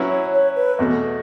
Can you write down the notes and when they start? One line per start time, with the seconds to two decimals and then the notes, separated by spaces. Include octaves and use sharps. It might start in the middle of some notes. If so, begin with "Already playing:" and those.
Already playing: F#3 C#4 E4 B4
0.10 C#5
0.33 C#5
0.56 B4
0.79 E2 B2 A3